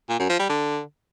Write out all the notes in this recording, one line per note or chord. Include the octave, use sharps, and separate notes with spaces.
A#2
F#2
F3
G3
D3